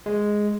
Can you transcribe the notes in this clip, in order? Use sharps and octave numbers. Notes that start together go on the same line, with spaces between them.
G#3